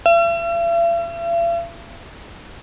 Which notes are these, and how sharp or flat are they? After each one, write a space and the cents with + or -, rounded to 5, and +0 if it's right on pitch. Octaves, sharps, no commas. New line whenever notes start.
E5 +45